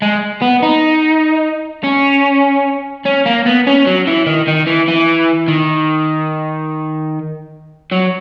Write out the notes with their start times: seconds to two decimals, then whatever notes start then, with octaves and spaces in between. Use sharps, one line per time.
0.02 G#3
0.42 B3
0.63 D#4
1.84 C#4
3.05 C#4
3.26 A#3
3.46 B3
3.67 C#4
3.86 F#3
4.07 E3
4.27 D#3
4.48 D#3
4.67 E3
4.88 E3
5.48 D#3
7.91 F#3